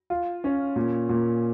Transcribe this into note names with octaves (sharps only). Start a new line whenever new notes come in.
F4
C#4
A#2
A#2